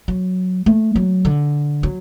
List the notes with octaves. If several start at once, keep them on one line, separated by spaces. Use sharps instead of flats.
F#3
A3
F#3
D3
F#3